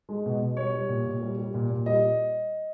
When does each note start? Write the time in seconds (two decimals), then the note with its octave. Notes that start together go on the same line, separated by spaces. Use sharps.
0.09 G#3
0.26 B2
0.41 B2
0.57 G3 C#5
0.73 G3
0.89 A#2
1.05 A#2
1.22 G3
1.38 G3
1.54 A#2
1.70 A#2
1.86 G3 D#5